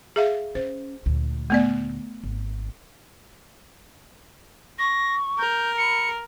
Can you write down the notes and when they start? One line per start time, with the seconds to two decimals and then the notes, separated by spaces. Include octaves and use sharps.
0.16 G#4 E5 F5
0.55 C#4 C5
1.06 D2 A#2
1.50 A3 B3 D5
2.24 G#1
4.79 C#6 A#6
5.39 A#4 G6
5.78 B5 C#7